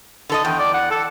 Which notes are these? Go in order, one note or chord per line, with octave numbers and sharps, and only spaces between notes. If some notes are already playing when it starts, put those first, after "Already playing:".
D3 A4 D#5
E2 G5
D5
F#5
A4